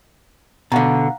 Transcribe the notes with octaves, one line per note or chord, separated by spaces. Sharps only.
B2 D3 F5 F#5 A#5